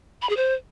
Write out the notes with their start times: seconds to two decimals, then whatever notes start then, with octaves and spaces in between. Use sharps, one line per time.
0.22 B5
0.29 G#4
0.37 C5